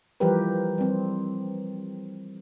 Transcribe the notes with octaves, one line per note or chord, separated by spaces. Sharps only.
E3 F3 G3 G4 A#4 B4
G3 C4